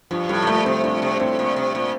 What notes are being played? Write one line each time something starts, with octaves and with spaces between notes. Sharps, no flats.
G2 F3
A2 G3
C3
A#2 A3
C3 C4
A#2 D4
C3
A2 C4
A#2
C3
A#2